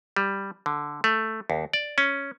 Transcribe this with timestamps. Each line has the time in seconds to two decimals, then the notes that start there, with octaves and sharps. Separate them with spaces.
0.16 G3
0.66 D3
1.04 A3
1.50 D#2
1.73 D5
1.98 C#4